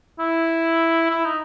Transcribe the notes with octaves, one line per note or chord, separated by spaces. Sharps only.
E4
E4
D#4